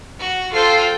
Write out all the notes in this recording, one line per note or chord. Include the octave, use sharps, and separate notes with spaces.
F#4
F4 A4 C5 G5